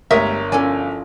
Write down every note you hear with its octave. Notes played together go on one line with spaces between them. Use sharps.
G1 G#3 A3 G4 A#4 C#5 E5 D#6
F3 C#4 E4 A4 D5 G#5